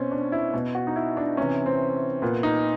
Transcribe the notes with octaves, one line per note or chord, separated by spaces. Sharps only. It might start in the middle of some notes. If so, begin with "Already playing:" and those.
Already playing: B2 C4 C#4
D4
E4
B2
F#4
D#4
E4
D4
C3 E3 C#4
C4
A#2 B3
D#4